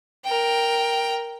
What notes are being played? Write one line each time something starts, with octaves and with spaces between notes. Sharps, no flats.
A#4 G5